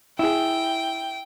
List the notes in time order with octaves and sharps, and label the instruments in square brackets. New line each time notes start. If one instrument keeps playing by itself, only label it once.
[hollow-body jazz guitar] E4 G#4 [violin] G5